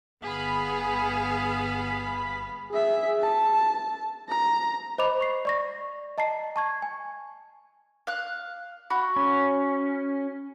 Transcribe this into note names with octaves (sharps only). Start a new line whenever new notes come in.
G1 B3 G#4 F5 B5 B6
G#4 E5
A5
A#5
C5 D#5 B5 D6 F7
C#6 C7
D5 C#6 A#6
D#5 A5 A#5 C7
A5 C#6 G#6
G#5
F5 F#6
F#4 B5
C#4